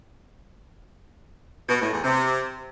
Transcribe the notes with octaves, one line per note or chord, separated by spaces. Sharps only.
B2
A2
E2
C3